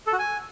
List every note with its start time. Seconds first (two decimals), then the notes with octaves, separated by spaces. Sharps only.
0.07 A4
0.13 F#4
0.19 G#5